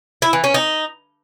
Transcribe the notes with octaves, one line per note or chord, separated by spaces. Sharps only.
E4
E3
C#4
D#4